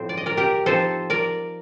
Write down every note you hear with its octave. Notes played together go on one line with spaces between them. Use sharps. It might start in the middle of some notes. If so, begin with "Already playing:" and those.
Already playing: A2 F3 C4 C5
D5
D#5
A#4 D5
G4 A#4
F3 C4 D#4 A4 C5
A#4 D5